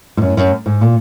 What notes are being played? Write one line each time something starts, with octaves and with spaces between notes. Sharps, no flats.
G#2
F#2
F#2
G#2
A#2